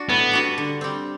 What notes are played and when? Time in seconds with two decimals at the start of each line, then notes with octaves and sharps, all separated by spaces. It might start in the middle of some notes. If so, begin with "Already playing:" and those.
Already playing: D4 F#4
0.09 A2 B3
0.32 G3 D4 F#4
0.58 D3
0.81 G3 C4